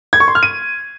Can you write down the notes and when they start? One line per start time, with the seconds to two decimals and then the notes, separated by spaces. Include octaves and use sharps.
0.13 G#6
0.20 C#6
0.28 C6
0.35 F6
0.43 D#7